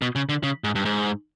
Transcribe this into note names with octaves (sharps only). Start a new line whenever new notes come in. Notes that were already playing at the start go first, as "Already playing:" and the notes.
B2
C#3
D3
C#3
G#2
G2
G#2